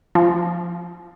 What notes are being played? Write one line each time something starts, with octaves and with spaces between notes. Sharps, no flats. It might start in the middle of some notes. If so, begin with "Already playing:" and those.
F3